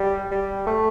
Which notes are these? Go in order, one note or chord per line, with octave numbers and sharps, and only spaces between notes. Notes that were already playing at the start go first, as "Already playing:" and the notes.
Already playing: G3
G3
A3